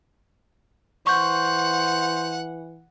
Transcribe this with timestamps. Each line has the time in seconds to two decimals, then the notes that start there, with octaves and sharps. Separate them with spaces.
1.07 E3 C5 F#5 C#6 G6